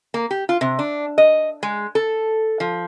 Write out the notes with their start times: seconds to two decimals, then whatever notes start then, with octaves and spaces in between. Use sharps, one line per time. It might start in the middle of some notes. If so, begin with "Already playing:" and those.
0.14 A#3
0.31 G4
0.49 F4
0.61 C3
0.79 D4
1.18 D#5
1.63 G#3
1.95 A4
2.60 F3